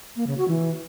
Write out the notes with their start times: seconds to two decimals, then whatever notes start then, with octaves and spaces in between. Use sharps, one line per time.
0.16 A#3
0.27 C#3
0.38 F#4
0.48 E3